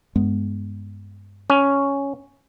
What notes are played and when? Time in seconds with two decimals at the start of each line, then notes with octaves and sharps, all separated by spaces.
0.16 G2 G#3 B3
1.50 C#4